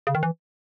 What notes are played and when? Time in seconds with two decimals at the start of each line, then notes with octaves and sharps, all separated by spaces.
0.07 C#3
0.15 D#3
0.23 E3